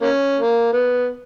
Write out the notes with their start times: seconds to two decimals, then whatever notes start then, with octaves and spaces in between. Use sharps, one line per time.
0.01 A#3 C#4
0.37 A#3
0.73 B3